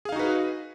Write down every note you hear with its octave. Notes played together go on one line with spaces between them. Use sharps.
D#4 F#4 G#4 B4 F5